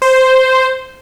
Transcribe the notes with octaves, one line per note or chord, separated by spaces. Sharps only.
C5